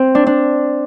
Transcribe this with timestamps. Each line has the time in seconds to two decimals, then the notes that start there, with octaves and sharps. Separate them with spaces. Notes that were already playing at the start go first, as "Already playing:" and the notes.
Already playing: C4
0.15 D4
0.27 D4